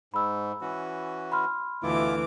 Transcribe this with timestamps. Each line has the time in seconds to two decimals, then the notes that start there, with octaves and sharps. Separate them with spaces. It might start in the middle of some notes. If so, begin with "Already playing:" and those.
0.14 G#2 B5 E6
0.61 E3 C#4 F#4
1.32 B5 C6 F6
1.83 D2 B2 E3 E4 F4 D6